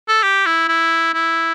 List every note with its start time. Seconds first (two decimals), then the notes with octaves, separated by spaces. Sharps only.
0.08 A4
0.23 G4
0.46 E4
0.68 E4
1.14 E4